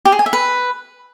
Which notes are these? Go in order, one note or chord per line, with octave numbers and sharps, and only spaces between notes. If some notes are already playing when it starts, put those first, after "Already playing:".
G4
G#4
G#5
E5
B4